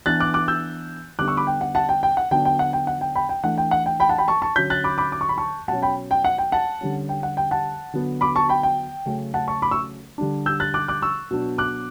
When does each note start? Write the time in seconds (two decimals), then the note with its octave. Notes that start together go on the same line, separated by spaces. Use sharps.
0.06 E3 B3 D4 F#6 A6
0.20 D6 F#6
0.34 D6 F#6
0.48 E6 G6
1.19 D3 G3 B3 D4 D6 F#6
1.28 C#6 E6
1.37 B5 D6
1.47 G5
1.61 F#5
1.75 F#5 A5
1.89 G5
2.03 G5
2.17 F#5
2.31 D3 F#3 B3 D4 G5
2.45 G5
2.59 F#5
2.73 G5
2.87 F#5
3.01 G5
3.15 G5 B5
3.29 G5
3.43 E3 A3 D4 F#5
3.58 G5
3.71 F#5
3.86 G5
4.00 G5 B5
4.09 F#5 A5
4.18 G5 B5
4.28 A5 C#6
4.42 A5 C#6
4.56 D3 F#3 C#4 G6 B6
4.70 F#6 A6
4.84 B5 D6
4.98 B5 D6
5.12 D6
5.21 C#6
5.29 B5
5.38 A5 C#6
5.68 B2 F#3 C#4 F#5 A5
5.82 G5 B5
6.11 G5
6.25 F#5
6.38 G5
6.52 F#5 A5
6.81 D3 G3 C#4
7.09 G5
7.23 F#5
7.37 G5
7.51 F#5 A5
7.93 D3 F#3 B3
8.21 B5 D6
8.35 A5 C#6
8.49 G5 B5
8.63 G5
9.06 C#3 F#3 A3 C#4
9.34 F#5 A5
9.48 A5 C#6
9.62 B5 D6
9.71 C#6 E6
10.18 D3 G3 D4
10.46 E6 G6
10.60 F#6 A6
10.74 D6 F#6
10.88 D6 F#6
11.02 C#6 E6
11.31 B2 F#3 B3 D4
11.58 D6 F#6